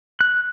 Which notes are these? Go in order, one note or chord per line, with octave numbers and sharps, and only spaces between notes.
F#6